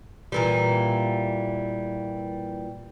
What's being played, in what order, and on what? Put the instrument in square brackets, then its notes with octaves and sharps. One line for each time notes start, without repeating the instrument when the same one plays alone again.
[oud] A#2 E3 G3